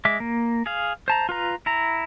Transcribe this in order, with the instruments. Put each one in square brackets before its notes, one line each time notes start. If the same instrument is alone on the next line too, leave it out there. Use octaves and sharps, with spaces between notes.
[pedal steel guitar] G#3 E5 D6
A#3
G#4 F5
C5 A5 A#5
F4 B4 A#5
E4 A#5